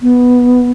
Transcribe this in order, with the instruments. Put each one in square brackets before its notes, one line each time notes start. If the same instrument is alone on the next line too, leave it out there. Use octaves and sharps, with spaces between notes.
[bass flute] B3